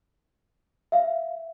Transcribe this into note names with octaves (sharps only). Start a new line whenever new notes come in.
E5 F5